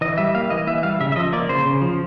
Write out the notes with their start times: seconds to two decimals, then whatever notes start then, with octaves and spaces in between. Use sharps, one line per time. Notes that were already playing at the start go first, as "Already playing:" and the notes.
0.01 E3 D#5
0.18 G3 E5
0.35 A#3 F5
0.50 E3 D#5
0.67 E3 E5
0.83 G3 F5
1.00 C#3 E5
1.12 E5
1.16 F3 D#5
1.32 A#3 D5
1.49 C#3 C5
1.66 C#3
1.82 F3